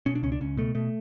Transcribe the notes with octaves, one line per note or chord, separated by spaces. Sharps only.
B2 C#4
D4
C#2 C#4
D4
C#2 C#4
B2 A3
B2 A3